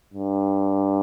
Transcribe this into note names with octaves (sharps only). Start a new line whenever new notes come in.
G2